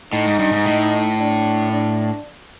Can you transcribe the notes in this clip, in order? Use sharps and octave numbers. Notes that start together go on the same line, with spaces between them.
A2 D#4
G#2
G2
G#2
A2
D4
D4